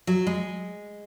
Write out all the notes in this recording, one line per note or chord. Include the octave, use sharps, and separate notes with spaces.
F#3
G#3